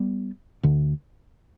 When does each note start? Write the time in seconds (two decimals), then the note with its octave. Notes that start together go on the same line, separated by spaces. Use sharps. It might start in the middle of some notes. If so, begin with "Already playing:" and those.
Already playing: G3 B3
0.63 D2 D3